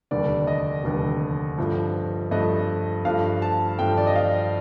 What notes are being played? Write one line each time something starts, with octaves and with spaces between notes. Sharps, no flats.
F1 D#2 D3 G3 D5
D#5
F1 D#2 D3 G3
G2 F3 A3
G2 F3 A3 D#5
G2 F3 A3 F5
A5
G2 F3 A3 G5
D5
D#5
F5